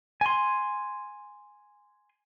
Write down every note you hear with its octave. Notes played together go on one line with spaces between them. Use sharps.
G#5 C6